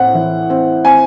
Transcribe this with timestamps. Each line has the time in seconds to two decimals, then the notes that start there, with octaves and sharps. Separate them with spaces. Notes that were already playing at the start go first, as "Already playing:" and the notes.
Already playing: A2 C4 F#5
0.14 E3
0.50 C4
0.85 C4 G#5